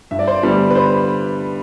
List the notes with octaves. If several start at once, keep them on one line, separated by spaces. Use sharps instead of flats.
G2 E5
D5
C5
D5
D3 G3 B3
B4
C5